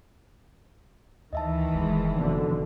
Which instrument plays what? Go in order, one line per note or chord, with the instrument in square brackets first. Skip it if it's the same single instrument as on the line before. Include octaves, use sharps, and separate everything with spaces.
[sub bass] D2 [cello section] D#3 E3 [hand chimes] D#5 E5 A5
[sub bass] F1 [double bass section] G#3
[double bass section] F#1 B2 D3 [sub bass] F3